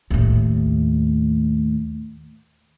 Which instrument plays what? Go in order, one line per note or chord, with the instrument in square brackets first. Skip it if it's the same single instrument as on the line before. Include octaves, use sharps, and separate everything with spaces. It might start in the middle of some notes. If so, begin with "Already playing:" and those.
[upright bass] D#2 A2